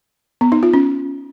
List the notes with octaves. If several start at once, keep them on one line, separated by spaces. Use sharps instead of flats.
B3
D#4
F4
C#4